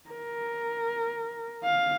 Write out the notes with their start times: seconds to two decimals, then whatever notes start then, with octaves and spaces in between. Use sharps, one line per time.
0.10 A#4
1.64 F5